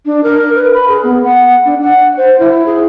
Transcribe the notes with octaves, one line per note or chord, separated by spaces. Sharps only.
D4
A#4
B4
B5
G#4
B3
F#5
D4
F#5
C5
E4
G#4